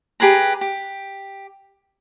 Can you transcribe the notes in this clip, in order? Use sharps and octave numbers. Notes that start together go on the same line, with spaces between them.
G4 G#4 B4 A#5
G4